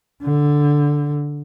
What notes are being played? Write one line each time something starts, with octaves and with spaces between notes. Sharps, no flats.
D3